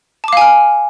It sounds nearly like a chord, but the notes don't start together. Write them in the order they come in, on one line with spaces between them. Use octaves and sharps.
A5 D6 F5 G#5 F6